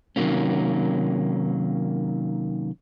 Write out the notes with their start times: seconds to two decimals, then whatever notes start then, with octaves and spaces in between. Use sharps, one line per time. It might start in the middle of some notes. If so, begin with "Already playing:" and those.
0.16 C3 D#3 F3 F#3 A#3 C#4